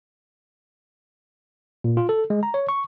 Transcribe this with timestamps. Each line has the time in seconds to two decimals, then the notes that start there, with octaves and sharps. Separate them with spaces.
1.84 A#2
1.97 F4
2.09 A4
2.30 G#3
2.43 A#5
2.54 C#5
2.69 C#6